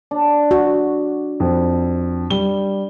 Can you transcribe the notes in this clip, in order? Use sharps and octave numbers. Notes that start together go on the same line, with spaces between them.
D4
F#4
F2
G3 G7